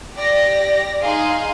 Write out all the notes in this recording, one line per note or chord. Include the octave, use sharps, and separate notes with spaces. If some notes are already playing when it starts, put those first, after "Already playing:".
G4 D5 A#6
D#4 G#4 F5 C6